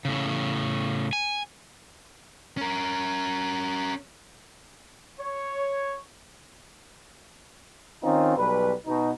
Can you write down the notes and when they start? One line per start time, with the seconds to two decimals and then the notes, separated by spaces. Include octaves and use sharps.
0.05 A2 C#3
1.13 G#5
2.58 C#4 A#4
5.19 C#5
8.03 D#3 C4 C#4 D#4 F4
8.37 B1 G3 B4
8.86 B2 D#4